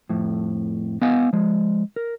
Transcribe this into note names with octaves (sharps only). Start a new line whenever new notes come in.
F2 A2
B3 D#5 F5 G#5
F3 G#3
A#4